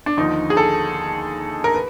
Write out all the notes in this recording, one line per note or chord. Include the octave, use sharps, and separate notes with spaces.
D4
D#2 D3 F3 D#4
G#4
A4
A#4
B4